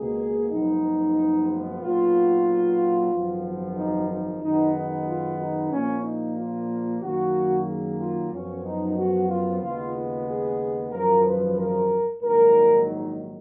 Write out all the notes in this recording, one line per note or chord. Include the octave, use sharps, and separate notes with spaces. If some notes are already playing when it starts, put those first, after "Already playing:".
Already playing: C#2 B2 A#3 G#4
F#1 F#2 F3 G#3 B3 D#4
B1 A#2 F#3 B3 F4
G#1 F#2 F3 B3
D#4
D#4
F#2 D#3 G#3 B3 D#4
D#4
F4
D#4
A#1 A#2 F3 A#3 C#4
D#4
F4
F#2 D#3 F#3 A#3 F#4
G#4
F4
F#2 F3 B3 C#4
D#4
F#4
F4
D#2 C#3 G#3 B3 F4
F4
G#4
G#1 F#2 F3 A#4
B4
A#4
A#1 G#2 D#3 F#3 A#4
D#4